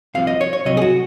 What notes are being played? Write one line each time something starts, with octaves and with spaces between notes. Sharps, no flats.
C2 C3 F3 F5
D#5
C#5
C#5
C2 C3 F#3 D#5
G#4
F#4